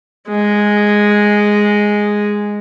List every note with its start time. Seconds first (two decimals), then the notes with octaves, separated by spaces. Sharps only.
0.29 G#3